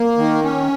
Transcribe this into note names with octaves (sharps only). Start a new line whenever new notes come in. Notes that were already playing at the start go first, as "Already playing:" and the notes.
Already playing: A#3
D#3
C#4